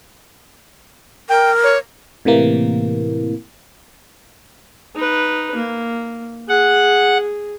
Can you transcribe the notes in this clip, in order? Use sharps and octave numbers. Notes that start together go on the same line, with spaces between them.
A#4 G5
C#5
A2 C3 E3 A#3
D#4 B4
A#3
G#4 F#5